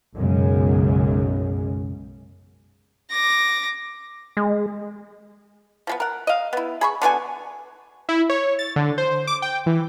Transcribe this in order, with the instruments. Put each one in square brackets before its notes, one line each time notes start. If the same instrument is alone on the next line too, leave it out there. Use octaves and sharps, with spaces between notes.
[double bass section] B1 F#2 C#3 G#3
[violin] D6 A#6
[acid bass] G#3
[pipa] F3 G#3 B3
A#4 F#5
D#5 F5
B3 E4
G#4 B5 C#6
D3 B3 F#4 G#5
[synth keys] E4
C#5
A6
D3
C5
D6
G5
E3